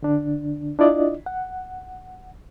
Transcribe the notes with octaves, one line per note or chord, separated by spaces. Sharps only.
D3 D4
D4 E4 F4 D5 D#5
F#5